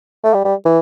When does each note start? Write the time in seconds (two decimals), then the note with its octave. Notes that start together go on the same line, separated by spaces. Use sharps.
0.24 A3
0.34 G3
0.45 G3
0.65 E3